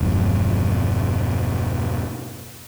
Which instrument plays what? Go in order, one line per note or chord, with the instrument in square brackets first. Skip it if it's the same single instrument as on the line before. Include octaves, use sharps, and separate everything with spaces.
[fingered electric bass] E1 G2 F3